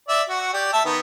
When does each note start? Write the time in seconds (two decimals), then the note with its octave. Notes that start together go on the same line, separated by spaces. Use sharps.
0.09 D5 E5
0.29 F#4 F#5
0.54 G4 D5
0.73 E5 A5
0.85 D#3 B3